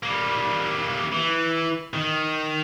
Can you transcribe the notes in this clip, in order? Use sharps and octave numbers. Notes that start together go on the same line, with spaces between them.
G3 A#3
E3
D#3